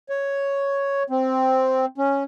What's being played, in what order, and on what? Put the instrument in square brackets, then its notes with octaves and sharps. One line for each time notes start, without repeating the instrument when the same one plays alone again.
[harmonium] C#5
C4
C#4